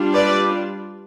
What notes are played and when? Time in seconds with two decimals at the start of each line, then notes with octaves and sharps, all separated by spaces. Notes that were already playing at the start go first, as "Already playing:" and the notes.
Already playing: G3 D4 F4
0.14 B4 D5